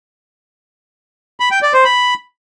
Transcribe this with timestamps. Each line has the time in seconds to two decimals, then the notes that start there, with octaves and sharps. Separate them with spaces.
1.40 B5
1.51 G5
1.62 D5
1.74 C5
1.85 B5